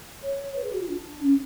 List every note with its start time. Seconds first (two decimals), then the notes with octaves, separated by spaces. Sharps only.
0.23 C#5
0.56 B4
0.64 G#4
0.73 F#4
0.81 F4
0.89 D4
1.23 C#4